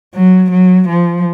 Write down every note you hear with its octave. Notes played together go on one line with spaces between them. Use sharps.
F#3
F#3
F3